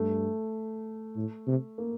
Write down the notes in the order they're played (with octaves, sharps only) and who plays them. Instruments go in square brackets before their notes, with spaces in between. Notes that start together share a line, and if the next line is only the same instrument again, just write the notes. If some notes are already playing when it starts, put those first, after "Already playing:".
Already playing: [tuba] G2 [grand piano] A3
[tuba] A2
C3
[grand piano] A#3